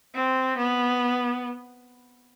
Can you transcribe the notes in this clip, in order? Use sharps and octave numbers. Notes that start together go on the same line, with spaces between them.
C4
B3